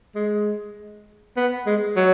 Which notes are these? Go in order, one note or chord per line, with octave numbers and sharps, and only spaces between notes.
G#3
B3
G#3
F#3